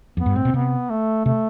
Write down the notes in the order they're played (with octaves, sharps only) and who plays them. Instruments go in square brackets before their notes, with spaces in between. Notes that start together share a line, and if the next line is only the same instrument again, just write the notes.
[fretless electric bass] F2 [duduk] B3
[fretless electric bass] G2
[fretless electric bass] A2 [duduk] C4
[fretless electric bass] B2
[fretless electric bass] C3 [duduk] B3
[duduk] A3
[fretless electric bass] C3 [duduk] A3